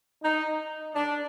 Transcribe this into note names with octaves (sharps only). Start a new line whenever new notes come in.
D#4
D4